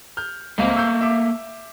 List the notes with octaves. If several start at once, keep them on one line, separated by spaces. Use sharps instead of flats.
F6 G6
C#2 A3 A#3 C4 F5
C#6 E6 G6
E5 D6